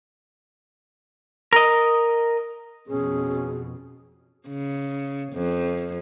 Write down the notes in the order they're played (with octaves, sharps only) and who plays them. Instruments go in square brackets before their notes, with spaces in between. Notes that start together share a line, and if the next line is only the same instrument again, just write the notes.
[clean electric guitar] A#4 D#5
[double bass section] F2 B2 [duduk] C#4 [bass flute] G#4
[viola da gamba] C#3
F2